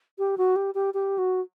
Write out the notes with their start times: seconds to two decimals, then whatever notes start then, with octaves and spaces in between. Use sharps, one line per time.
0.19 G4
0.38 F#4
0.56 G4
0.75 G4
0.94 G4
1.18 F#4